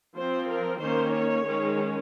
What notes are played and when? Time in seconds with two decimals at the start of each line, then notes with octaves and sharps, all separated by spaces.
0.17 F3 C4 C5
0.49 A#4
0.81 D#3 A#3 C#4 C5
1.13 C#5
1.45 D#3 G#3 C#4